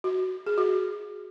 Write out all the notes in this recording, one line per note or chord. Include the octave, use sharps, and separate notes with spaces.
F#4
G#4
F#4